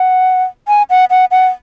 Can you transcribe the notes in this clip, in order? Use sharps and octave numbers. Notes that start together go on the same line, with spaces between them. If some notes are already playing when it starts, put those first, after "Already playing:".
Already playing: F#5
G#5
F#5
F#5
F#5